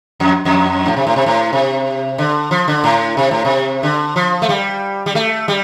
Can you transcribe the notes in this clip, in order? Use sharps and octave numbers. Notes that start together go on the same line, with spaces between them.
F2
F2
A2
C3
A2
C3
A2
C3
D3
F3
D3
A2
C3
A2
C3
D3
F3
A3
G3
G3
A3
G3